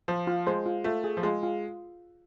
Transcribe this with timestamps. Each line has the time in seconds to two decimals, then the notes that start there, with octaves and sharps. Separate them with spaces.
0.08 F3 C5
0.27 F4
0.46 G#3 C5
0.66 F4
0.84 A3 F4
1.04 G#4
1.17 F3
1.23 G#3 F4
1.43 F4